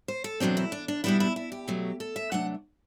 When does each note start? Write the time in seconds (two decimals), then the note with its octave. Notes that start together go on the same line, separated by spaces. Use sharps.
0.08 C5
0.24 A4
0.40 E2 B2 F#3 C4 D4
0.57 E4
0.72 D4
0.88 D4
1.04 B2 G3 B3 D4 E4
1.20 E4
1.36 E4
1.52 G4
1.68 B2 F#3 A3
2.00 A4
2.16 E5
2.31 C3 F#3 A3 D4 F#5